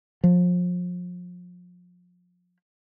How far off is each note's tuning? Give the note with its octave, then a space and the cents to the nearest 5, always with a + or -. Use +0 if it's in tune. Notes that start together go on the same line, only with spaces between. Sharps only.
F3 +35